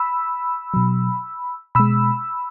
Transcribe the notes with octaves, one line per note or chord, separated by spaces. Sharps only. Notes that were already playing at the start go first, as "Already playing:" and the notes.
Already playing: B5 E6
B2 F#3
B2 G#3 B5 E6